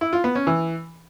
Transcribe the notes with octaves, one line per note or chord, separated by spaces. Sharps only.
E4
F4
B3
C#4
E3